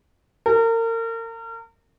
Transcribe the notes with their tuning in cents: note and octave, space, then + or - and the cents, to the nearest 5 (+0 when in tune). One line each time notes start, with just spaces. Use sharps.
A#4 -35